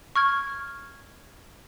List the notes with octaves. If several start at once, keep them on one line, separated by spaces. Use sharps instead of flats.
C#6 F6 G#6